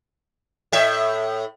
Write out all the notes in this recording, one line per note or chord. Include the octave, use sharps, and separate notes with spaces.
A2 E5